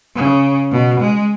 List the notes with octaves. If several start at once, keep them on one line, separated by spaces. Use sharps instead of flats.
C#3
B2
G#3